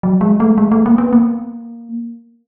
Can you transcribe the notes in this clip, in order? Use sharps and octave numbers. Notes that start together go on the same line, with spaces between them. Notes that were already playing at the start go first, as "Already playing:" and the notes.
F#3
G#3
A3
G#3
A3
A#3
B3
A#3